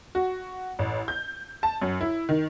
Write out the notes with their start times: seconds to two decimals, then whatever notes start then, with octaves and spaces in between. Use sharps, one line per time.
0.15 F#4
0.79 A1
1.08 G6
1.63 A5
1.82 F#2
2.01 E4
2.29 D#3